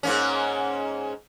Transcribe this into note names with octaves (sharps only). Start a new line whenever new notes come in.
G#2 A#3 C#4